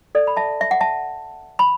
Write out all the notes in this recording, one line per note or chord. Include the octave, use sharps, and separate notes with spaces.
A4 D5
B5
E5 A5
E5
F#5
E5 A5
B5